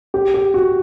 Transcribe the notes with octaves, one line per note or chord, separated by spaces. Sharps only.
G4
G4
F#4